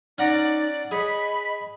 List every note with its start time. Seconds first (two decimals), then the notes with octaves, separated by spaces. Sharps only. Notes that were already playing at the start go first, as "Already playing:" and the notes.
0.18 C#4 D#4 D5 F#5 A#5
0.91 G#4 C#5 D#5 B5